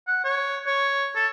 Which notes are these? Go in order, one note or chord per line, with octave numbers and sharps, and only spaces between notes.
F#5
C#5
C#5
A4